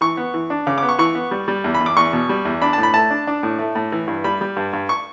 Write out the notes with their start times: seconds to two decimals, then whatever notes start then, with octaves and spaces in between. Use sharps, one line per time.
0.01 E3 C#6
0.17 B3
0.34 E3
0.50 D4
0.67 C#3 D6
0.78 D6
0.82 B3
0.89 C#6
0.99 E3 C#6
1.15 B3
1.31 G3
1.48 G3
1.64 E2
1.74 B5
1.81 E2
1.86 D6
1.97 E2 C#6
2.13 B2
2.29 G3
2.45 E2
2.62 D4 B5
2.73 A5
2.78 A2
2.83 B5
2.94 A3 A5
3.10 D4
3.27 D4
3.43 A2
3.59 A3
3.75 A2
3.92 E3
4.08 G2
4.24 G3 B5
4.41 G3
4.57 G2
4.73 G2
4.89 C#6